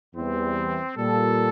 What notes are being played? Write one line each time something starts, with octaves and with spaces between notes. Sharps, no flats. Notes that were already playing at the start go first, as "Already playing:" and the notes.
E2 E3 G3 C4
A#2 G3 A4